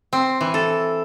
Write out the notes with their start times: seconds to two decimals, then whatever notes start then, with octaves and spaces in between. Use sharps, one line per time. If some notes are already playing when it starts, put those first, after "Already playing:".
0.13 C4
0.41 E3
0.54 A4